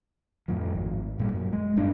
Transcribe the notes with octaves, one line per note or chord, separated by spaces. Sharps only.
F2 A2 F3
G#1
A1 A#2 C#3 G3
F#2
G#3
F#1 G2 A#2 D4